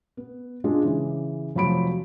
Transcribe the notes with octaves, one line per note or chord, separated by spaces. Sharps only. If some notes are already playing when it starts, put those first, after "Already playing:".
B3
G#3 D4 F4
C#3 E3
F1 F3 F#3 B5 D7